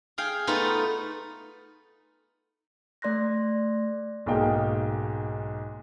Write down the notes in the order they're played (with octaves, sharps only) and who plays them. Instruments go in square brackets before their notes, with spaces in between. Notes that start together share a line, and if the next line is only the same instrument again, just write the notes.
[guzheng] G#4 F5 G5
A3 B3 D#4 F4
[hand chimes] A3 D5 C6 F#6 A#6
[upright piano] B1 G#2 A#3 G#4 G5